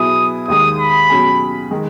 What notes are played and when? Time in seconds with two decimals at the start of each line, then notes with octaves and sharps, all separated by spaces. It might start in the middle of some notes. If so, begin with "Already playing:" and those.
Already playing: B2 F#3 B3 E4 G#4 D#6
0.48 D#2 D#3 G#3 D#6
0.79 B5
1.09 B2 F#3 C#4 G#4
1.71 D#3 G#3